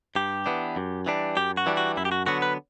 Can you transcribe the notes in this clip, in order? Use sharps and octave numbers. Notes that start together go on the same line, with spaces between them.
G2 G4
E3 B3 D4
F#2
E3 G3 D4
F#2 G4
F#4
E3 G3 D4
F#4
F#2 E4
G4
F#4
D3 F#3 B3 F#4
B4